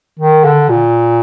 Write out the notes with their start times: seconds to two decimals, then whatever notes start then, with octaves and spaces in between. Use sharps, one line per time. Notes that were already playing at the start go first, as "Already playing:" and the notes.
0.19 D#3
0.45 D3
0.69 A#2